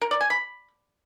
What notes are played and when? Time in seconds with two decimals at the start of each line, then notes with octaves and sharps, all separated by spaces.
0.01 A#4
0.11 D5
0.21 G#5
0.30 B5